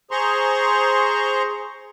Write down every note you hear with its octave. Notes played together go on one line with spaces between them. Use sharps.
G#4 C5 A#5 C6 C#6